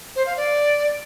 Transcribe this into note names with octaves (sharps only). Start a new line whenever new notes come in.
C5
F5
D5